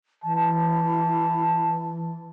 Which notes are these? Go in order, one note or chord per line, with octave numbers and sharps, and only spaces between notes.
E3 A5